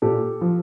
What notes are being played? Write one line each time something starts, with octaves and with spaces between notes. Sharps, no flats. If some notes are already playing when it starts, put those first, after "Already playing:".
A#2 G4 A4
F3